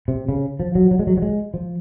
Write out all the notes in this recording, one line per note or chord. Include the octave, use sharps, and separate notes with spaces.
C3
C#3
F3
F#3
F#3
G#3
F#3
F#3
G#3
F3